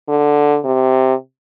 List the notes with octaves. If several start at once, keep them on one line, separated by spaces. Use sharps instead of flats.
D3
C3